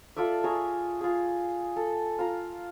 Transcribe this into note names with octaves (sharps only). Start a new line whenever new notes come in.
F4 A4 D5 E5
G#4 A#5 C#6
F4 G#4
A4
F4 A#5